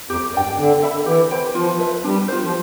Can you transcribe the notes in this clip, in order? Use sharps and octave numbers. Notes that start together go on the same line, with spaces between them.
F2 G4
G2 D5 G5
D3 D4
A4 E5 B5
E3 G4
C5 G5 B5
F3 F4
B4 E5
G3 D4
F4 C5
F3